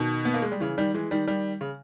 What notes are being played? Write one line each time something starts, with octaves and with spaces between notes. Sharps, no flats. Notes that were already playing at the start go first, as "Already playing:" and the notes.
Already playing: B2 D#3
B3
A#3
G#3
G3
C#3 E3
D#3 G3
E3 G#3
D#3 G3
D#3 G3
C#3